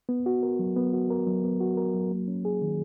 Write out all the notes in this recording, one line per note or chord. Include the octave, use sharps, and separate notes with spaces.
B3
F#4
A#4
F#3
B3
F#4
A#4
F#3
B3
F#4
A#4
F#3
A#3
C#4
G#4
D#3